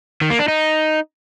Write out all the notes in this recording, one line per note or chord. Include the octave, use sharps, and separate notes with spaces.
D#3
A#3
D4
D#4